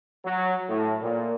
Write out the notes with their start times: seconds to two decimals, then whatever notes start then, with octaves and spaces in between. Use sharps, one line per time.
0.24 F#3
0.68 A2
1.02 A#2